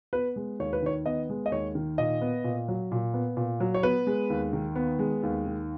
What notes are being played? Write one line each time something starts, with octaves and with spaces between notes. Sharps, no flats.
B3 B4
G#3
D#2 C#5
B4
D#3 C#5
B3 D#5
G#3
D#5
D#2 C#5
D#3
A#2 D#5
B3
A#2
F#3
A#2
B3
A#2
F#3
C#5
B3 B4
G#3
D#2
D#3
B3
G#3
D#2
D#3